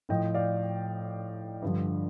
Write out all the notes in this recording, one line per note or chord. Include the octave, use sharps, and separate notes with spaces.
A2 F3 D#5 G5
D5 F5
G2 D3 F3